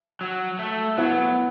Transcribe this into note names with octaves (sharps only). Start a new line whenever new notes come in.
F#3
A3
F#3 B3 E4